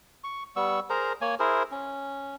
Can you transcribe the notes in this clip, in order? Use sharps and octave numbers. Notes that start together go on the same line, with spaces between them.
C#6
G3 B3 C#6 E6
G#4 A#4 C5 A#5
A#3 C#5 G#5
E4 G#4 A#4 C5
C#4